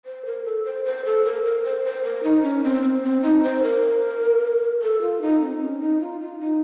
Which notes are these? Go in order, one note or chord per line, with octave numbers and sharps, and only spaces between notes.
C5
A#4
A4
C5
C5
A4
A#4
A#4
C5
C5
A#4
D#4
C#4
C4
C4
C4
D#4
C5
A#4
A4
F4
D#4
C4
C#4
D#4
F4
F4
D#4